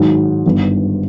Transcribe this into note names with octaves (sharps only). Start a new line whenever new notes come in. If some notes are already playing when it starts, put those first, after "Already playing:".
Already playing: G#2 D#3 F#3
G1 G2 D#3